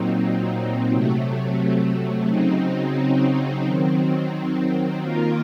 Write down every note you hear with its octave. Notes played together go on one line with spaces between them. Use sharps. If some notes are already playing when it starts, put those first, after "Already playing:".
Already playing: A#2 F#3 C4 D#4
C3 F#3 A3
C#3 F#3 C4 D#4
D#3 F#3 C4
D#3 A#3 F4 A#4